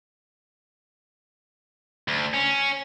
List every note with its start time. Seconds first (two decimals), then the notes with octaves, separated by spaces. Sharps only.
2.08 D2
2.34 C#4